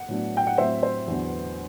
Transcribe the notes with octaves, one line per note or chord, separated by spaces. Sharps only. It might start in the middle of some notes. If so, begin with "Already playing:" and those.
Already playing: F#5
A2 F#3 B3 D4
G5
F#5
A2 F#3 C4 C5 E5
C5
E2 D3 F#3 B3